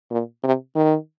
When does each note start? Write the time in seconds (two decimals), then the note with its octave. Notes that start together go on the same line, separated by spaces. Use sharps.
0.11 A#2
0.44 C3
0.76 D#3